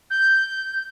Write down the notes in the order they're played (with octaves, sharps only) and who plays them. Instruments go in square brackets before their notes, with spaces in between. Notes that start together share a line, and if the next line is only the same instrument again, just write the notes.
[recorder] G6